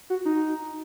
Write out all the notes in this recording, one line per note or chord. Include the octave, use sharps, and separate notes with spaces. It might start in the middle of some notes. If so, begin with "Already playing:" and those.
F#4
D#4